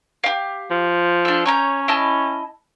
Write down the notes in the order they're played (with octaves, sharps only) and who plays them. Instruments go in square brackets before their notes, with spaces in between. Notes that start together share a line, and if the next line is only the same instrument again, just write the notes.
[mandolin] G4 F5
[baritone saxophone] F3
[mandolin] D4 A4
[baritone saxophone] C#4 [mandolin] C#5 A#5 G6
[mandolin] E4 D#5 A5